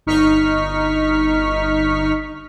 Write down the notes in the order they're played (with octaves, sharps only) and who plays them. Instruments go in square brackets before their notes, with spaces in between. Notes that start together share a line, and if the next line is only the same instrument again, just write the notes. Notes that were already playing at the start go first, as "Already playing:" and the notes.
[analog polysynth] G1 D#4 C#6 F6 B6